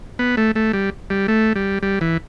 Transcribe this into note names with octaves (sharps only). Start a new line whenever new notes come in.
B3
A3
A3
G3
G3
A3
G3
G3
E3